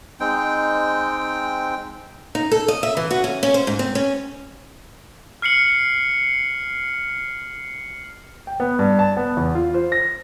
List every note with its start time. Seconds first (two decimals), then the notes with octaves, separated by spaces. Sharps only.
0.20 G#3 C4 D#4 G5
2.35 D#4
2.52 A4
2.68 D#5
2.83 E5
2.97 E3
3.11 F#4
3.24 C#4
3.43 C#4
3.54 C5
3.67 G#2
3.79 C4
3.95 C#4
5.42 F6 C7 C#7 F#7
8.47 G5
8.60 B3
8.79 G2
8.99 A5
9.17 B3
9.37 E2
9.55 F4
9.74 C5
9.92 A#6